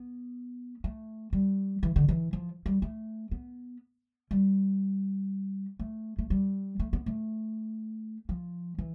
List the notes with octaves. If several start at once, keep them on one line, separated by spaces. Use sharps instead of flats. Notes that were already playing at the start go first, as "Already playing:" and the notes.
Already playing: B3
A3
G3
E3
D3
E3
F3
G3
A3
B3
G3
A3
A3
G3
A3
B3
A3
F3
E3